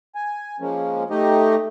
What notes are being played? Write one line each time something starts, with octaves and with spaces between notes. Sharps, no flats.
G#5
F3 G#3 A#3 C#4
A3 D#4 G4 D#5